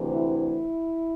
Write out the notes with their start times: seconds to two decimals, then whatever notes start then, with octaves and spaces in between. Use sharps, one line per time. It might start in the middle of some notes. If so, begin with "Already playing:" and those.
Already playing: D2 C3 E3
0.10 E4